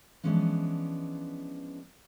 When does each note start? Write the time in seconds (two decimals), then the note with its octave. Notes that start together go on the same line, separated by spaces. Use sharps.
0.23 E3 F3 G#3 B3 C#4 D4